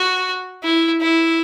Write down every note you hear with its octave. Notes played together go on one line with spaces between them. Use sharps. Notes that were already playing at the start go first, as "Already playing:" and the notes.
Already playing: F#4
E4
E4